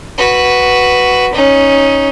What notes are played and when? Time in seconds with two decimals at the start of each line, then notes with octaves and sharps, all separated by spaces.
0.18 F#4 B4
1.34 C#4 D#4